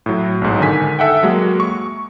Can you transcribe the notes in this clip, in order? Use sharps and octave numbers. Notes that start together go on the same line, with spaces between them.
A2 F#3
B1 G#2
D3 D#3 G#5 B6
A4 E5 F#5 G5
F#3 G#3 A#3 F#4
C#6